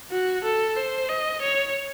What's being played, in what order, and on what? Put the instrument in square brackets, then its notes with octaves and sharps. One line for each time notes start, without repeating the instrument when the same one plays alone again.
[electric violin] F#4
A4
C5
D#5
C#5